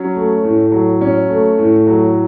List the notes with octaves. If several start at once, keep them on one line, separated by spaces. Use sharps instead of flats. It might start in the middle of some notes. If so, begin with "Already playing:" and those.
Already playing: F#3 C#4
A3
A2
F#3
C#4
A3
A2
F#3